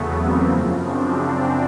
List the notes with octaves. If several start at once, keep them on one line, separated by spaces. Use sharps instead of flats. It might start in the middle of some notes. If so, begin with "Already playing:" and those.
Already playing: E2 C#3 F#3 A3 B3
A#3 C4
F#2 C#3 F3
C4 D4